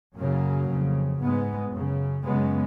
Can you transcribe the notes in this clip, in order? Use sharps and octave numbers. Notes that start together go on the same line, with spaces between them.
F#2 C#3 F#3 A#3
F2 C#3
G#2 G#3 B3
F#2 C#3
F#2 C#3 G#3 B3